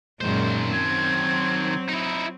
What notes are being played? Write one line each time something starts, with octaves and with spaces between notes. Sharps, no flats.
F#2 A#2 D#3 G#3 C5
F#3 C4 G#6
D#4 E4